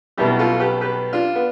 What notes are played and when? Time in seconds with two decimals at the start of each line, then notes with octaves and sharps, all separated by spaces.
0.18 B1 B2 G3 E4 G4
0.39 F4 A4
0.60 G4 B4
0.81 G4 B4
1.13 D4 F4
1.35 B3